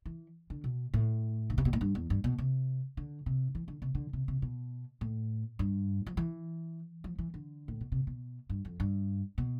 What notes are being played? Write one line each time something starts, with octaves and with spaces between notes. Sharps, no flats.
E3
D3
B2
A2
D3
C3
B2
A2
G2
E2
G2
B2
C3
D3
C3
E3
D3
C3
D3
C3
C3
B2
A2
G2
F3
E3
F3
E3
D3
A2
B2
C3
B2
G2
F2
G2
B2